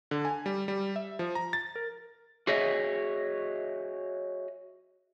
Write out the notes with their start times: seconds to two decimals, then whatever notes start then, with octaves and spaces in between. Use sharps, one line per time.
0.11 D3
0.25 G#5
0.46 G3
0.68 G3
0.96 E5
1.19 F3
1.35 A#5
1.53 A6
1.76 A#4
2.47 F#4 G#4 C#5 D#5 E5